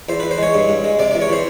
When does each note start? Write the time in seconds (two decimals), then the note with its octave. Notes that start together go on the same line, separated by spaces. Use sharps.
0.09 E2 C5
0.20 E2 B4
0.31 C5
0.38 G#3 C#5
0.54 G2
0.69 G2
0.84 G#3
0.99 C3 D5
1.11 E2 D5
1.22 C#5
1.29 E3 C5